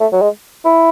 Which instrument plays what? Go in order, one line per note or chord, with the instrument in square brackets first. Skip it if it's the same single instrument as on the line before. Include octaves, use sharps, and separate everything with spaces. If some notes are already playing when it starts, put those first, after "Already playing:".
[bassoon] A3
F#3
G#3
E4